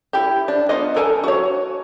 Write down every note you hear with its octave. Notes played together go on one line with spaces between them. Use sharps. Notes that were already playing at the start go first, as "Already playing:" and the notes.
E4 G4
D4
B3 F4 D#5
A4 A#4 G#5 A5
F#4 C#5